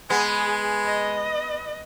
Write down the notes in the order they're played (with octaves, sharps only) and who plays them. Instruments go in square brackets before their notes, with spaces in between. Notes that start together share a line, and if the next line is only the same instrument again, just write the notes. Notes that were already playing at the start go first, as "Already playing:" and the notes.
[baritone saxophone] G#3 [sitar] B3 [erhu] G#4
[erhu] D#5